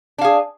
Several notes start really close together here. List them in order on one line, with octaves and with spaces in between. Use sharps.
D4 F5 G#4